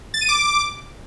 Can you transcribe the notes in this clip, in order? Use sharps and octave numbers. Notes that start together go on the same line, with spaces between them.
A6
D#7
D6